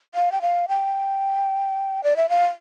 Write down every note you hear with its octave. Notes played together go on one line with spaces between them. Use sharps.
F5
G5
F5
G5
D5
E5
F5